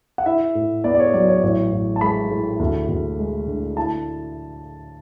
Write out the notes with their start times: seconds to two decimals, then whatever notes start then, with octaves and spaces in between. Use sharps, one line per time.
0.18 F#5
0.26 E4 E5
0.55 A2
0.84 B3 D5
0.95 D5
0.99 C#5
1.14 F#3 D5
1.28 C#5
1.43 A1 C#5
1.72 A1
1.96 A5
2.01 G#3 B5
2.30 A2
2.60 D2
2.89 D2
3.19 G#3
3.47 D3
3.77 E4 A5